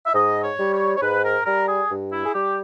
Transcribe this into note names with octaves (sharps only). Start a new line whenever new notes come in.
E5
G#2 D#5
C#5
G3
C#5
C#5
G#2 B4
A#4
G3 A#4
G#4
G2
E4
G#4
G3 G4